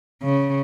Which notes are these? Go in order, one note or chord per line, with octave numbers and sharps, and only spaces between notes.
C#3